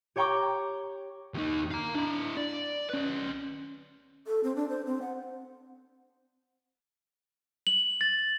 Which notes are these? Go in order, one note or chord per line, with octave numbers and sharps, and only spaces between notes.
G4 C#5 G5 A#5 C#6 D6
D#2 D#4
F5 A#5
D4 E4
D5
C#4 B4
A4
C4
D4
C5
C4
F#5
F#7
A6